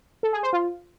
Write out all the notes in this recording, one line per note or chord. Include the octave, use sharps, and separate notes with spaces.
A4
G#4
C5
F4